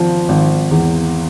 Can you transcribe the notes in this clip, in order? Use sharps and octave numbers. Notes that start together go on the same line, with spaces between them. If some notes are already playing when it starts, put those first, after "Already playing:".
Already playing: G#1 F3
G#1
E2